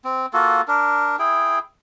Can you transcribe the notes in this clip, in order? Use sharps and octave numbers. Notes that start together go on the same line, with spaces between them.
C4
A#3 F4 F#4 A4
D4 A#4
E4 G#4 G5